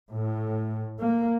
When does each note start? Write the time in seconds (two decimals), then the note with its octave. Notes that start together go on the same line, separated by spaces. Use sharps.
0.11 A2
1.00 A#3